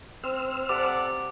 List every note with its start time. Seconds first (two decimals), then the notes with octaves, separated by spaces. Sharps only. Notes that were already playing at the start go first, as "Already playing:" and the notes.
0.24 C4 C5 E6 F6
0.69 C3 A4 D5 F#5 D6